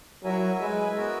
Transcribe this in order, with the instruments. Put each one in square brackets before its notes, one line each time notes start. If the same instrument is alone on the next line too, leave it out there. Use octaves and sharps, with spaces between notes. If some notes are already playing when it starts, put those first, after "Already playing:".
[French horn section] F#3 [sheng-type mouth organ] E4 A#4 E5 G#5
[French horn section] G#3 [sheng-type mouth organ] E4 B4 E5 G#5
[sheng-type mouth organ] B3 F#4 A#4 E5